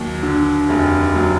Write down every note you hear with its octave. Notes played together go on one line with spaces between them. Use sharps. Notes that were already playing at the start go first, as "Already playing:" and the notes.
Already playing: D#2 F#3
D3
F1
F#3